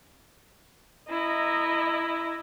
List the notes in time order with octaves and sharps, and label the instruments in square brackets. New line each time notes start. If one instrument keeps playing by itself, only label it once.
[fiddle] E4 [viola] D#5 A#5